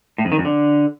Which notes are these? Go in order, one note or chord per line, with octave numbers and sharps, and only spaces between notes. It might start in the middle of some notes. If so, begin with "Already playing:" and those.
A2
F2
D#3
F2
D3